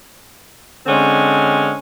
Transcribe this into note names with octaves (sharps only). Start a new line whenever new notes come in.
D3 G#3 C4 C#4